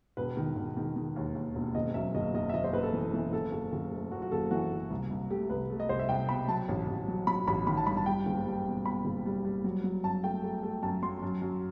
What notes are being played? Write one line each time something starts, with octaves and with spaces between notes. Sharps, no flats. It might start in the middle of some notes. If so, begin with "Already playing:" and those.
E1 B4
D#3
E1
D#3
D#3
D#2
D#2
E1
F#1 D#5
F#2 E5
F#1 D#5
F#1 D#5
E5
F#1 D#5
C5
F#1 B4
A4
E3
E3
F#1 A4
F#1
F#1
A3
F#2 F#4
F#4
F#1 A4
E3 F#4
F#1
C2
C2
A3 G4
C2 B4
A3
D#5
C2 C5
E5
C2 G5
B2 B5
F#3 A5
A1
A1
F#3
F#3 B5
A1 B5
D#3 B5
A5
G2 B5
A5
G3 G5
F#1
G3
B2
B2 B5
F#1
G3
G3
F#3
F#3
F#2 A5
A3 G5
A3
A3
F#2 A5
F#3 C6
F#2
F#2